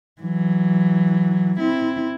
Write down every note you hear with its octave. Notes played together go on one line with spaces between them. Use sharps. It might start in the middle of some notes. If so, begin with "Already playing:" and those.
E3 F#3
C4 E4